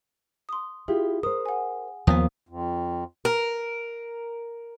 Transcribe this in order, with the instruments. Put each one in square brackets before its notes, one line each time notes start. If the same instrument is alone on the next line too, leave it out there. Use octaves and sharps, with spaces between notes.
[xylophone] C6 D#6
[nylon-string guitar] E4 F4 G4 [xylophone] G#4
[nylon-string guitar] A#4 C5 [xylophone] D#6
[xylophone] F#5 G#5
[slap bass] D#2 B3 [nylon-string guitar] F3 A#3 [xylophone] D#6
[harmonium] F2
[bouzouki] A#4